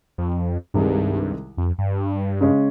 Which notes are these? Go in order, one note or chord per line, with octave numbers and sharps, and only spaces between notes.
F2
C2 G2 C3 D#3 G#3
F2
G2
C#3 G#3 C#4